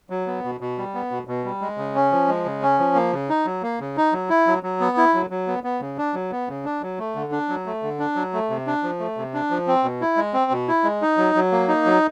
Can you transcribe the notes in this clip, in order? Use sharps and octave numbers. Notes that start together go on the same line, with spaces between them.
F#3
B3
B2
B2
G3
B3
B2
B2
G3
G#3
C#3
C#4
F3
G#3
C#3
C#4
F3
A#3
C#3
D#4
F#3
A#3
C#3
D#4
F#3
E4
F#3
F#3
B3
E4
F#3
F#3
B3
B3
C#3
D4
F#3
B3
C#3
D4
F#3
A3
D3
D4
F#3
A3
D3
D4
F#3
A3
C3
D4
F3
A3
C3
D4
F3
C4
B2
E4
G#3
C4
B2
E4
G#3
D#4
F#3
F#3
A#3
D#4
F#3